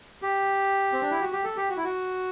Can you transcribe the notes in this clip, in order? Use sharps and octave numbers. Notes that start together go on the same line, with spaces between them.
G4
C4
D4
E4
F#4
G4
A4
G4
F#4
E4
F#4